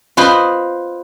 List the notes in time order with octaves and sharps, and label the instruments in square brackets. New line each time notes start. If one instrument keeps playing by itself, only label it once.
[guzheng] F4 B4 C5 D#5